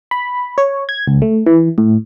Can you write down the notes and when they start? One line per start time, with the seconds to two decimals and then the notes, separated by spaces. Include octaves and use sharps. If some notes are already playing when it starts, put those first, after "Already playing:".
0.11 B5
0.58 C#5
0.89 G#6
1.07 C#2
1.22 A3
1.46 E3
1.78 A2